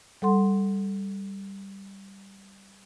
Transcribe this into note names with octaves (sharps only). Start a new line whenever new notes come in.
G3 A4 F#5 C6